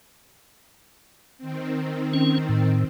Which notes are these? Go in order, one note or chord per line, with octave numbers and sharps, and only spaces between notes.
D#3 C4
C#4
A2